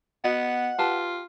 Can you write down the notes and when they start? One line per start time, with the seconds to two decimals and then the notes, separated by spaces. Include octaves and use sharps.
0.24 B3 F#4 D#5 F#5
0.79 F4 G4 B4 A5